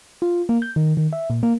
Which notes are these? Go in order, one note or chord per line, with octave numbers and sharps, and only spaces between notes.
F4
A#3
G6
D#3
D#3
E5
A#2
A#3